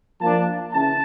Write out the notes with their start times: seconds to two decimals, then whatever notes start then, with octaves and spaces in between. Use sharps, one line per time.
0.21 F3 A#3 D4 A5
0.73 C#3 E3 A5